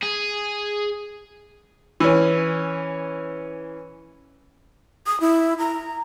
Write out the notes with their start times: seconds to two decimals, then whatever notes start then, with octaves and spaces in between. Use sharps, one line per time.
0.02 G#4
2.00 E3 C#4
5.07 D#6
5.21 E4
5.59 A#5